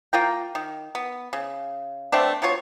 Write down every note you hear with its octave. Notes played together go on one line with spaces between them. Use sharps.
A#3 F4 A#4 G5
D#3
B3
C#3
A3 B3 C4 D4
F#3 B3 F4 C#5